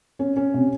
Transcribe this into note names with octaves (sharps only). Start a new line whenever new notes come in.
C#4
C#4
C3